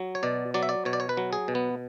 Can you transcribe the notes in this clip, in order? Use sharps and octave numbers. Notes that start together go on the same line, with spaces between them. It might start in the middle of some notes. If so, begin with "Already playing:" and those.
Already playing: F#3
C#5
B2 D5
F#3 D5
E5
D5
B2 C#5
D5
C#5
B4
F#3
G#4
B2
B3